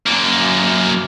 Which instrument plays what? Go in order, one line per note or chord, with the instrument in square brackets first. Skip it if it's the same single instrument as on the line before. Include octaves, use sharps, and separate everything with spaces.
[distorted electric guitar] F#2 A#3